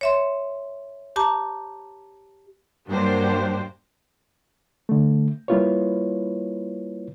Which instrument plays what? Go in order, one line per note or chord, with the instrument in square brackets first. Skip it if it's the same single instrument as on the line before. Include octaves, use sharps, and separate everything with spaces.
[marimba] C#5 E5 C6
G4 A5 A#5 D6
[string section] G2 F#3 A#3 D4 G4 C5
[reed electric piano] D3 A3
G3 A#3 E4 F4 B4 C#5